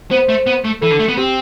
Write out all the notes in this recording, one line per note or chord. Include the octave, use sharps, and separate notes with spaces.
B3 C5
A3
B3
A3
E3 A4
D3
A3
B3
C4 G4